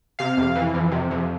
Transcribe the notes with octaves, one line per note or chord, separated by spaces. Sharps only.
C3 F5
F2
E3
F2
C3
F2